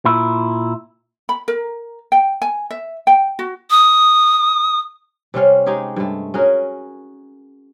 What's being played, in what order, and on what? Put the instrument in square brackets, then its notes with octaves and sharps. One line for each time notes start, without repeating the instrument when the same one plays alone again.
[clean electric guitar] A#2 E4
[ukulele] B5
A#4
G5
G#5
E5
G5
F#4
[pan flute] D#6
[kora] C3 G3 C#4 F5
G#3 D#4 G4 G#4
G2 G#3 A3
C#4 F#4 G#4 A#4